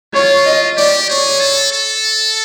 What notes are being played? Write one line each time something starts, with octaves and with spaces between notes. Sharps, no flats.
F4 C#5
D#5
G4 D5
G#4 C#5
A4
A4